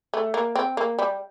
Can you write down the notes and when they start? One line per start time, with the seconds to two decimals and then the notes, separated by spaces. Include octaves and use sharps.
0.14 A3
0.34 A#3
0.56 C4
0.77 A#3
0.99 G3